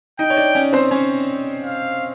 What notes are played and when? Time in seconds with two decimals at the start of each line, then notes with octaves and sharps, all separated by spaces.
0.19 D#4 D#5 G5
0.30 C#5
0.37 D4 D5
0.55 C#4 C#5
0.73 C4 C5
0.91 C#4 C#5
1.63 F5